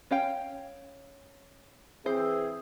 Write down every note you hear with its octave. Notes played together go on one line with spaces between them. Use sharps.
C#4 F5 G5
E3 C4 G#4 C5